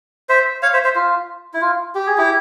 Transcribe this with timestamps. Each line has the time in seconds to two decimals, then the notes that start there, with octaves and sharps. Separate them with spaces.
0.29 C5 E5
0.62 C#5 F5
0.73 C5 E5
0.84 C5 E5
0.95 F4
1.54 E4
1.61 F4
1.95 G4
2.07 G#4
2.17 E4 G4